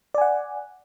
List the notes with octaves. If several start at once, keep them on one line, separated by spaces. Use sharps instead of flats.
D5 F#5 G#5